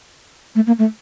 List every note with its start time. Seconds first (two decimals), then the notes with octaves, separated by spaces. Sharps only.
0.55 A3
0.67 A#3
0.79 A3